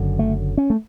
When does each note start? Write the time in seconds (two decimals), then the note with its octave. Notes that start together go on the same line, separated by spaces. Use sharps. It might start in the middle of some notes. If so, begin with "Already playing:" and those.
Already playing: F#1 F#2 D3
0.19 A3
0.57 C#4
0.70 A3